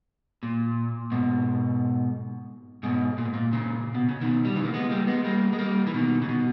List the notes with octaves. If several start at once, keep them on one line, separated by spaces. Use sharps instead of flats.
A#2
G#2 B2
G#2 B2
A#2
G#2
A#2
A#2 C#3
B2
C#3
B2 D#3
G3
C#3 E3
A#3
G#3 B3
G3 A#3
G#3 B3
G3 A#3
G#3
G3 A#3
E3
B2 D#3
C#3
B2